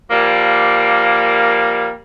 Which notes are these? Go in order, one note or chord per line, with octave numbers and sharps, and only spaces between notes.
F3 G3 A#3